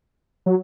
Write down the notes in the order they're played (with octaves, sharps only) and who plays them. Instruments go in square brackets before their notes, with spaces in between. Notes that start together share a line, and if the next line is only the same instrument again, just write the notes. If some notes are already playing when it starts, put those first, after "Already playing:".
[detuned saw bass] F#3